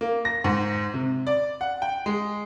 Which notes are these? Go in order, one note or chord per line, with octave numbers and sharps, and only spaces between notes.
A#3
A#6
G#2
C3
D5
F#5
G5
G#3